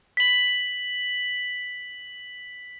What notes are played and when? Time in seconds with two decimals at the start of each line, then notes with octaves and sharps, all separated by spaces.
0.17 B6 F#7